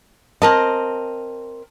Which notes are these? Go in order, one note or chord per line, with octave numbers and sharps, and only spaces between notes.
C4 A#4 D#5 A5